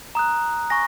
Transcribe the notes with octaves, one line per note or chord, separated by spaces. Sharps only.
A#5 D#6 F#6
G#5 C#6 A#6